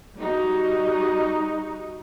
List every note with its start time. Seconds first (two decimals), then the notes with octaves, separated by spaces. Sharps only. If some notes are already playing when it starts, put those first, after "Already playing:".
0.16 G3 D#4 F#4